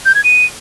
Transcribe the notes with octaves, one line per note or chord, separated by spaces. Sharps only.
G6
G#6
D#7